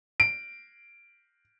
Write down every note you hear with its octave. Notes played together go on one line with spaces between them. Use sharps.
D7